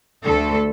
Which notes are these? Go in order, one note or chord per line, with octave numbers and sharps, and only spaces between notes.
D2 D3 A3 A4